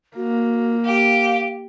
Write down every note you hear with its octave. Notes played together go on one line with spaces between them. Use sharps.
A#3 F#4
G4 F5